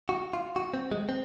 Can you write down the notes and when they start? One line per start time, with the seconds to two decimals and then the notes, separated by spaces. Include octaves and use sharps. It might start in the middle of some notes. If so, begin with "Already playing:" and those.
0.09 F#4
0.33 F4
0.56 F#4
0.74 C4
0.91 G#3
1.09 C4